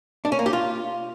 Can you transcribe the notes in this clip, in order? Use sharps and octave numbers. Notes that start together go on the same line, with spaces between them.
D4
C#4
A#3
G4
F4